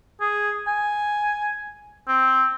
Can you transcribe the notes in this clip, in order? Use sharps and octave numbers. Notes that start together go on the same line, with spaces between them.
G#4
G#5
C4